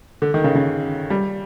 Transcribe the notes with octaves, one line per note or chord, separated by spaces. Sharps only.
D3
D#3
C#3
C#3
G3